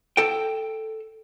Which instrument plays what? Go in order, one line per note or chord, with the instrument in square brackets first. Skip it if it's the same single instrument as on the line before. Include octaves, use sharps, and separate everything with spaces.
[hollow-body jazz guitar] A4 G5